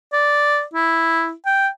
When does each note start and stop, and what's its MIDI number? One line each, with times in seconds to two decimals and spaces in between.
0.13 0.63 74
0.74 1.33 64
1.46 1.68 79